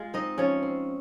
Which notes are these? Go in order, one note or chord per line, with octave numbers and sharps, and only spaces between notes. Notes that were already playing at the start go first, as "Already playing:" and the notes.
Already playing: G#3 F4 F5
C4 D#4 D#5
F3 C#4 C#5
C4